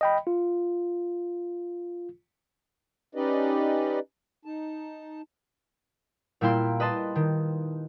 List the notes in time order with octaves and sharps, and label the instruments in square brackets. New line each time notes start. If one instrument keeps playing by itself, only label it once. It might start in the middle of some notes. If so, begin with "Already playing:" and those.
[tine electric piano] D#5 G5 B5
F4
[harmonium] C#4 D#4 G4 B4 D5 D#5
D#4 A5
[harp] A#2 G3 A#3 E4 G5 C6
B4 D#5 A5 C6
D#3